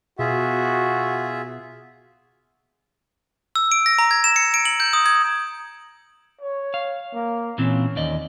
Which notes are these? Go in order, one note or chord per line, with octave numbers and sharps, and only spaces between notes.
B2 F4 F#4 G#4 E5
E6
D7
A#6
A#5
G#6
E7
C#7
D7
F#7
G6
D#6
G#6
C#5
F5
A#3
A#2 E3 C4 C#4
D#2 D5 D#5